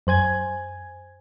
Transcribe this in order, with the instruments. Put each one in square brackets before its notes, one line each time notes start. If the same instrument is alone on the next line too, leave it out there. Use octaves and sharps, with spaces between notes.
[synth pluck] F#2 C5 G#5 G#6